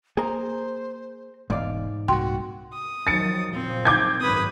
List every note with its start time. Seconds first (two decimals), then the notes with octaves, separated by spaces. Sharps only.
0.17 A#3 G#4 C5 A#5
1.50 E1 G#2 D5 F5
2.08 C2 A#2 F#4 G5 C6
2.73 D#6
3.07 D#3 F3 F#3 A6 C#7
3.53 F#1 A#2 F3 C4
3.85 D6 G6 G#6
4.20 G#1 F#2 B4 D#6